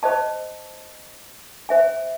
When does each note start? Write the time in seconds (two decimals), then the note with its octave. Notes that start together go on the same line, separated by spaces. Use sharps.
0.03 C5 D#5 A5
1.69 C5 E5 G#5